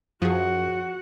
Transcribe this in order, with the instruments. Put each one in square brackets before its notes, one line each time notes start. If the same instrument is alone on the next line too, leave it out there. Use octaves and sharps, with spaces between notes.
[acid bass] F#2 [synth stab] F3 G#4 [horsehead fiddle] F#4 F#5